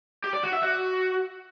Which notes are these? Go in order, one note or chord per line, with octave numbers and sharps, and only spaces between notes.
G4
D5
F#4
E5
F#4